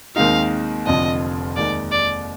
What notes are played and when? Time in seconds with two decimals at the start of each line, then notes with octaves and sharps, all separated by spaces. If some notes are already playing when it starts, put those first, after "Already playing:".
0.16 D#2 D#3 G#3 C4 D#4 F5
0.86 F1 F2 D3 F3 D#5
1.56 D#2 D#3 G#3 D#4 D5
1.92 D5